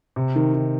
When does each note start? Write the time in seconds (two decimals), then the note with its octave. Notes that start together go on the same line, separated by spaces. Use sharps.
0.16 C3
0.36 D#3
0.55 D#3